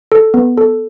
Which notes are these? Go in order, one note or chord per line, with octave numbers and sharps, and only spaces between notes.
A4
B3
A4